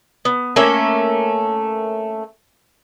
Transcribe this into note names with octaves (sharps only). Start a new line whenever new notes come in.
B3
A3 A#3 C#4 E5